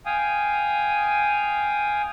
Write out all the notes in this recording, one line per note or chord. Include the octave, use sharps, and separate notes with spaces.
F5 G5 G#5 D#6